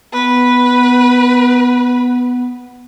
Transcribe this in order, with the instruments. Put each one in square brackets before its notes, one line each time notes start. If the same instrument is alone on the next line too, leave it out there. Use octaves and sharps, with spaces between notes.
[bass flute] B3 [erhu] B4